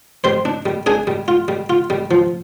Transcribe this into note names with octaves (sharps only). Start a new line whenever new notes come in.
G3 C5 C6
D4
G3
D4 G#4 G#5
G3
F4
G3
F4
G3
F3